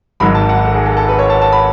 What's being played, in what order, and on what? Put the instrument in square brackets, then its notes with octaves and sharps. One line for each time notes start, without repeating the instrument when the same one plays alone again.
[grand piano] G#1 G#2 F#3 B5
A5
F#5
A4
G#4
A4
A4
B4
C#5
A5
A5
B5